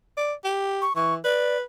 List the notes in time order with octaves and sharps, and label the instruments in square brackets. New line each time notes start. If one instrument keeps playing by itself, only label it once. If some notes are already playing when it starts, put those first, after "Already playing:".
[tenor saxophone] D5
G4
[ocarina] C#6
[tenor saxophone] E3 [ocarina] C#6
[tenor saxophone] B4 [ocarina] D5